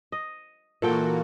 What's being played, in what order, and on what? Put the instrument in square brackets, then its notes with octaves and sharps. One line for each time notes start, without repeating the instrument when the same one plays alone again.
[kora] D#5
[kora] A#2 A4 G5 [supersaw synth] E3 A#3 F#4